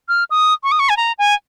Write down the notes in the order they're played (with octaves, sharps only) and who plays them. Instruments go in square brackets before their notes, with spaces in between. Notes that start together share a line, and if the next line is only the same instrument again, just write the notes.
[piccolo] F6
D#6
C#6
D#6
C#6
G#5
A#5
G#5